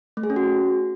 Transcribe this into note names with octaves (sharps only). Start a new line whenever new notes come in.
A3
G#4
C#4
F#4